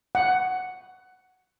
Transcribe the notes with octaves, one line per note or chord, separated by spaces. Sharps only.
F#5